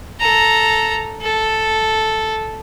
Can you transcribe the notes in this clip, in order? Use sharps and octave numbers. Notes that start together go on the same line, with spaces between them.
A4 A#5
A4